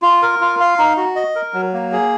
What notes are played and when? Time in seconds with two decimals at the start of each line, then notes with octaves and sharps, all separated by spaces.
0.02 F4
0.22 A#4
0.41 F4
0.60 F5
0.78 D#4
0.97 F#4
1.16 D#5
1.35 A#4
1.54 F#3
1.73 A#3
1.92 G#4